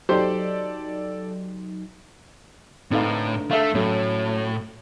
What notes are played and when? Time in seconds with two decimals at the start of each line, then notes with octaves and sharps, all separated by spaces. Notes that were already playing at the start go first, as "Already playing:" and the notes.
0.09 F#3 D#4 G4 A4 C5 D5 C6
2.91 A2 D3 C4 D#4 B4 F5
3.51 A3 A4 E5 F5
3.75 A2 F#3 A3 C#4